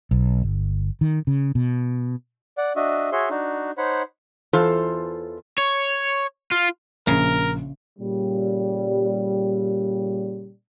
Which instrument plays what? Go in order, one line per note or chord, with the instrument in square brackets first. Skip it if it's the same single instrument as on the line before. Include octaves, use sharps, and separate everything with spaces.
[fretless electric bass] B1
G1
D#3
C#3
B2
[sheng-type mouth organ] D5 F#5
D4 F#4 D#5 E5
F#4 G#4 C#5 E5 C6
D4 D#4 F#4
D#4 C5 C#5 F#5 B5
[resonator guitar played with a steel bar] E2 E3 F4 A4 C5
[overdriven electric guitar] C#5
F4
[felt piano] A#1 [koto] C#3 [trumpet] A#4
[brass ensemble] A#2 C#3 G3